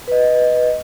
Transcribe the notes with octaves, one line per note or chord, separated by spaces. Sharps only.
B4 D#5